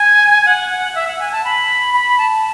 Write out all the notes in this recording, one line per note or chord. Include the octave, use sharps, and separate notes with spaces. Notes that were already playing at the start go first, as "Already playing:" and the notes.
Already playing: G#5
F#5
F#5
E5
F#5
G#5
A5
B5
B5
A5